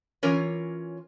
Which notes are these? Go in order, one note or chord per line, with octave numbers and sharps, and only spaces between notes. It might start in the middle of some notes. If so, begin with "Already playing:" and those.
E3 C#4 F4 A#4 C#5